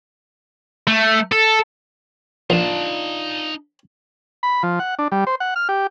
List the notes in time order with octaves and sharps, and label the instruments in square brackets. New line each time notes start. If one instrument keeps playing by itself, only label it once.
[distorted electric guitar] A3
A4
[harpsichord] A#1 [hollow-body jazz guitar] D4 F4 [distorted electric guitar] D#4 A5
[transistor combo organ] B5
F3
F#5
D4
G3
C5
F#5
F6
G4